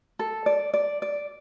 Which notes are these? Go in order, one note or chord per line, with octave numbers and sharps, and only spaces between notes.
A4
D5
D5
D5